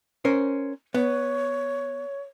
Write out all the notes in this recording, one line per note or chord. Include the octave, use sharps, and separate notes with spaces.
C#4 A#4 C5
B3 C#5